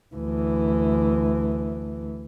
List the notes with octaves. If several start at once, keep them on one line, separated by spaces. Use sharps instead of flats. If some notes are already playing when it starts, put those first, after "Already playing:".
D2 E3